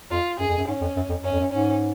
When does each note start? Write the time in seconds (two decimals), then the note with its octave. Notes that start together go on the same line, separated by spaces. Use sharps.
0.11 F2 F4
0.40 F#2 G#4
0.48 F2
0.58 F#2
0.68 G#2 C#4
0.81 F2
0.96 F#2
1.09 F2
1.24 F#2 C#4
1.32 F2
1.40 F#2
1.52 G#2 C#4